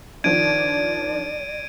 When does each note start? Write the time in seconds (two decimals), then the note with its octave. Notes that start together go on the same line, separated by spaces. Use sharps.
0.24 D#3 F3 D4 D5 G#6 D7 D#7